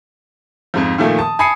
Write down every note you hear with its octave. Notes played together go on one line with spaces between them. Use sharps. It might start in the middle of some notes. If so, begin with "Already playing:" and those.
F2 G#2 F3
A#2 D#3 F3 A3 A#3
A5 D#6
G#5 A5 B5 D#6 C7 C#7